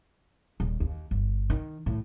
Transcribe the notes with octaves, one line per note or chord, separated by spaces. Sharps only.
D#1
D#2
G1
D#3
A2